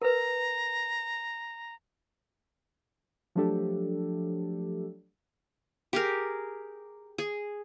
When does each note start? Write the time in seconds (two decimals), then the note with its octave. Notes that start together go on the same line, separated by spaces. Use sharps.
0.02 A#4 B4 A#5
3.35 F3 F#3 A3 D4 G4 A4
5.93 G4 G#4 A#4
7.18 G#4